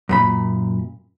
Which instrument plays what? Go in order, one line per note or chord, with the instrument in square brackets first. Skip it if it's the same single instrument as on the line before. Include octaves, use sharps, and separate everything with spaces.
[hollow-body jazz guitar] F#2 A#2 B5